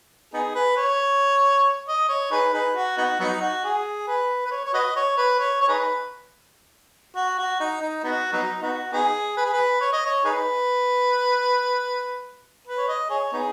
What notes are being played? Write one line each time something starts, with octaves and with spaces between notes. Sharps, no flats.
B3 D#4 G#4
B4
C#5
D#5
C#5
D#4 G#4 B4
D#4 G#4 B4
F#4
B3 D#4 F#4
F#3 B3 D#4
F#4
G#4
B4
B4
C#5
C#5
F#4 B4 D#5
C#5
B4
C#5
C#5
D#4 G#4 B4
F#4
F#4
D#4
D#4
B3 D#4 F#4
F#3 B3 D#4
B3 D#4 F#4
B3 D#4 G#4
B4
G#4
B4
C#5
D#5
C#5
D#4 G#4 B4
B4
C#5
D#5
G#4 C#5
B3 D#4 G#4